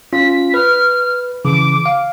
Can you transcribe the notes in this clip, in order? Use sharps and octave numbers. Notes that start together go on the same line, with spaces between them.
C#4 F4 B6
B4 F6
C#3 E3 D6
F5